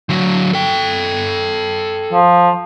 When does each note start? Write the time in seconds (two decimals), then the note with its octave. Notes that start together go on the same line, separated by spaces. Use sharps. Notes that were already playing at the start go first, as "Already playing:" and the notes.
0.09 D3 F#3
0.53 A4 G5
2.13 F3